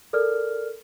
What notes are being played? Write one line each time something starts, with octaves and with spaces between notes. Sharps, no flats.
A4 A#4 D5 F6